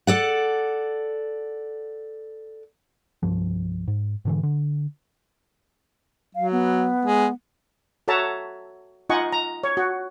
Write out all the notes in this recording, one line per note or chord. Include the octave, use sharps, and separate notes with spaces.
A4 D5 F#5
C2 G2 F3
G#2
G#2 D3 E3
D3
F#3 F5
B3
G#3
F#4 A4 C#5 E5 A5 A#5
D#4 F4 D#5 F#5 G#5 C#6
A#5
C#5
F#4